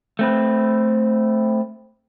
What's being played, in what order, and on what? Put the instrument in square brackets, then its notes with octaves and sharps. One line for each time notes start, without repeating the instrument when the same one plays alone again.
[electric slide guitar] A3 C4 B4